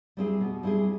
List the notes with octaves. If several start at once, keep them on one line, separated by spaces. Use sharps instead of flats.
G3 C4 E4 G#4
B2
G3 C4 E4 G#4